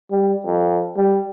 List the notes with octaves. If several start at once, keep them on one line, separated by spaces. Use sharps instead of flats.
G3
F2
G3